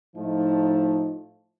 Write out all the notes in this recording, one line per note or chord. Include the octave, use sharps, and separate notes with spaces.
A2 F3 A3 D#4